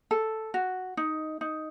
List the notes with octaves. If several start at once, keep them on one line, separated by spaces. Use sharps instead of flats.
A4
F#4
D#4
D#4